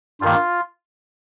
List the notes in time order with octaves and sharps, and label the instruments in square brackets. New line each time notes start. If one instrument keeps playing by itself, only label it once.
[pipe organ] G2 D#3 A#3 F4